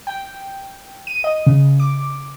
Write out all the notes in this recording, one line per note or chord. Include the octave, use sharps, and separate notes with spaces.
G5
D#7
D#5
C#3
D6